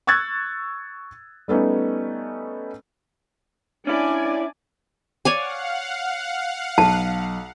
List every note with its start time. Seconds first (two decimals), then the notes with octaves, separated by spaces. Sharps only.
0.07 C#6 E6 F#6 G#6 A6
1.48 G3 A3 B3 C#4 D#4
3.87 C#4 D4 E4 D5 G#5
5.25 C#5 D5 F5 F#5 G#5
6.78 B1 A5